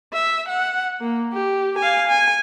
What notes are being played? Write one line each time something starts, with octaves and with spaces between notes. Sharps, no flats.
E5
F#5
A#3
G4
F5 G#5
G#5